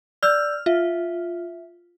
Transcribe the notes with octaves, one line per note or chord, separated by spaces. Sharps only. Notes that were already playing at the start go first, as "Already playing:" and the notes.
D5 E6 F6 G6
F4 E5